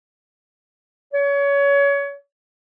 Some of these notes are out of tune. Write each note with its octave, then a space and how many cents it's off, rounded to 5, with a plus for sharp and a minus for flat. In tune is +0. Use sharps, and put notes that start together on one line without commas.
C#5 +25